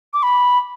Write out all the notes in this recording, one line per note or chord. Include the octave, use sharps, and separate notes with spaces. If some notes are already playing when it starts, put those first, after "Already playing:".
D6
B5